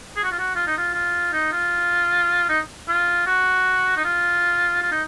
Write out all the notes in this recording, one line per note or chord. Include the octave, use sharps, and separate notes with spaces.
G#4
F#4
F4
F#4
F4
D#4
F4
F4
D#4
F4
D#4
F4
F#4
D#4
F4
F4
D#4